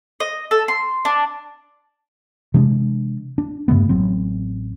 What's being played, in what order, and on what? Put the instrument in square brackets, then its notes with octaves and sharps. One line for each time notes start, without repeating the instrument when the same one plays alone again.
[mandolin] D#5
A4
C6
D4
[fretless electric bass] C3 E3 G#3 D4
D4
G2 C#3 A3 B3
A1 F#3 C4